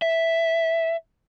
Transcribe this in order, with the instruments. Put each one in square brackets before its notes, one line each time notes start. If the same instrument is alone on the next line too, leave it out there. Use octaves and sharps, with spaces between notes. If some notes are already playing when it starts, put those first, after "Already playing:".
[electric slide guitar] E5